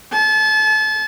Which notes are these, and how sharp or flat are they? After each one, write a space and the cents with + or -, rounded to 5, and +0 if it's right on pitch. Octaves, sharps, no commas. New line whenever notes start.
A5 -35